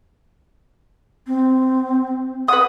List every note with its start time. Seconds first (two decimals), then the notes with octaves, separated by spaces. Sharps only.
1.27 C4
2.48 B4 F#5 D#6